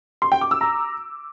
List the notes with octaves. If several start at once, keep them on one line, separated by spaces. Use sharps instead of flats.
C6
G5
D6
E6
A#5